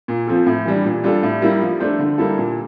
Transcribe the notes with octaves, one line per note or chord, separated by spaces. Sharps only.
A#2
F3 C4 F4 A4
A2
E3 G3 D4
A#2
G3 D4 F4 A4
A2
G3 A#3 E4
F3
A3 D4 A4 C5
D3
G3 A#3 E4 A4
A#2